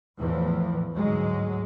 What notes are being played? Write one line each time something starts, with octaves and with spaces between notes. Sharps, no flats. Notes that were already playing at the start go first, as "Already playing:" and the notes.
E2 A2 E3 F3
D2 G#2 F#3 G#3